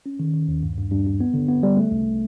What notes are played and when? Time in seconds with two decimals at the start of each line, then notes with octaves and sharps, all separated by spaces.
0.06 C#4
0.20 D#3
0.34 D#3
0.48 D#2
0.63 G2
0.78 G2
0.92 G2
1.06 G2
1.20 B3
1.34 D3
1.48 B3
1.63 G3
1.77 A3
1.92 C2